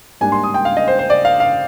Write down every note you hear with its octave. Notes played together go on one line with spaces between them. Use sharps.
G#2 G3 A#3 D4 G#5
C6
D#6
G5
F5
D#5
C5
C5
D5
F5
F5